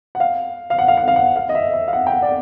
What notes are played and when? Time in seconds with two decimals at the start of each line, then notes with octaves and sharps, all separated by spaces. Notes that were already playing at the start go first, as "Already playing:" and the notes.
0.15 F#5
0.20 F5
0.70 F5
0.79 F#5
0.88 F5
0.97 F#5
1.08 F5
1.16 F#5
1.36 F5
1.49 D#5
1.55 E5
1.74 E5
1.88 F5
1.93 F#5
2.07 G5
2.12 F#5
2.22 D5